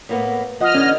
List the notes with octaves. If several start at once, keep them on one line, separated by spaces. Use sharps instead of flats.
A2 A#3 B3
F3 D#5 F#5 F6
D3 E3 C#4